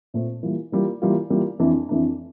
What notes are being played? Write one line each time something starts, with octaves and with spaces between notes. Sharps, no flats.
A#2 A3 C4
E3 G3 A#3 F4
E3 G3 A#3 F4
E3 G3 A#3 F4
E3 G3 A#3 F4
F2 E3 A3 D4
F2 E3 A3 D4